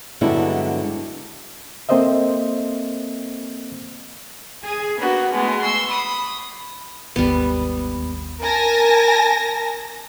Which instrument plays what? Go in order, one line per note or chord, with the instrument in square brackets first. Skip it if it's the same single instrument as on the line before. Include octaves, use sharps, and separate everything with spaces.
[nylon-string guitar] G2 D3 F#3 G#3 B3 E4
[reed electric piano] A#3 C4 A4 C5 D#5 E5
[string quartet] G#4 G#5
A#3 B3 D4 F#4
B2 G#3 A3 B3
C6 C#6 E6
B5 D#6
[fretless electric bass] G#1 D#2 [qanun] G3 B3
[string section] A#4 G#5 A5 A#6